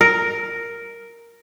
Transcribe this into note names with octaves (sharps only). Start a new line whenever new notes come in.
A#4